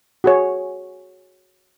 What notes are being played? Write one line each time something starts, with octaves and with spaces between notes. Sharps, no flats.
F#4 G#4 C#5